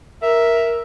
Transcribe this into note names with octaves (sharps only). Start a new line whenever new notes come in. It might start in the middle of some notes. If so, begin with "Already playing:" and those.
A#4 E5